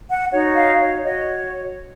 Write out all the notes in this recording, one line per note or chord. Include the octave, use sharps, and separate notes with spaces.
F#5
D#4 F#4 C#5
F5
C#5
F#4 C#5 D#5